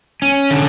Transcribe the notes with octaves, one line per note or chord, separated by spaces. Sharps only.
C#4
D3